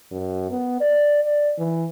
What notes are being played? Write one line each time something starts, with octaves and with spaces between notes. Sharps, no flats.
F#2
B3
D5
D5
E3